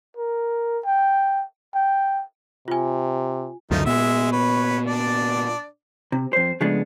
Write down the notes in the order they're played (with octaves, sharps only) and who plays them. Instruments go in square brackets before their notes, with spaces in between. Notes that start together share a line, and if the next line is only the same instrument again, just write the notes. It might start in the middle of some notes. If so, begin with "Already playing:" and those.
[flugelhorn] A#4
G5
G5
[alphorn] C3 [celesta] F4 G#5
[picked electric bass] C#2 F#2 D3 [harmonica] F3 A3 D#4
[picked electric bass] A#2 B3 [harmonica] G#3 E5
[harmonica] B4 C#5
D4 D5
[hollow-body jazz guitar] C3
F2 C5
C#3 F3 G#3 A3 B3 D4